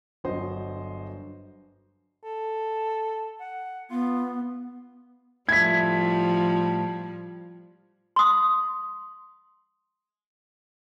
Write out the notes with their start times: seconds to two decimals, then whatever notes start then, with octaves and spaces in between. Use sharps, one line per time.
0.24 G1 F#3 C5 D#5
2.24 A4
3.40 F#5
3.91 B3 F4
5.49 A2 F3 G3 E4 G#6 B6
8.16 C6 D#6